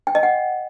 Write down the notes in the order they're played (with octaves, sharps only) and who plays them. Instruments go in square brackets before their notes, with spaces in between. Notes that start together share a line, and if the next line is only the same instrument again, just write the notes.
[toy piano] G5
D#5
F#5